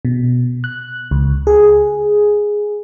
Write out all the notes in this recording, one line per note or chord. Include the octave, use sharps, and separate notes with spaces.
B2
F#6
C#2
G#4